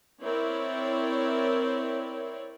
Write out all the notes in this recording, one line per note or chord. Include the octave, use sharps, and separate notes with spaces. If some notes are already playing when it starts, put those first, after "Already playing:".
C4 E4 A#4 C#5 D5